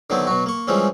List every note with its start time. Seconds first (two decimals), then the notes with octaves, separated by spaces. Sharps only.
0.10 D3 D#3 F#3 B3 C4 E4
0.27 B2 F#3 F#4
0.46 A#3 C#6
0.68 E3 F3 G3 G#3 C4 C#4